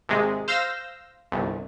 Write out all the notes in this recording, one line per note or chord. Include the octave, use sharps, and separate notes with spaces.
G#1 C3 G#3
C5 F5 E6 A#6
G1 C2